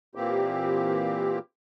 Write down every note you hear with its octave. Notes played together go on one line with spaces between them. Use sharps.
A#2 E3 A#3 C4 G4